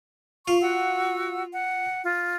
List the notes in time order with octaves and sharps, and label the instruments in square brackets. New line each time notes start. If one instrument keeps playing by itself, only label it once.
[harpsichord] F4 [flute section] C#6
[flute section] F#4 F#5 E6
F#5
F4